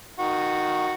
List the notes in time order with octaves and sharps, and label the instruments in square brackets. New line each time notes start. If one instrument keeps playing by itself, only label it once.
[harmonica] D#3 F#4